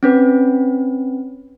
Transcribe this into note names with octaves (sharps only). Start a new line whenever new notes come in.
C4 C#4 B4